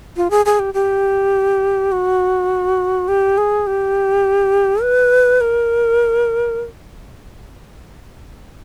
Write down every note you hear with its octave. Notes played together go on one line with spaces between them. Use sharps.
F4
G#4
G#4
G4
G4
F#4
G4
G#4
G4
B4
A#4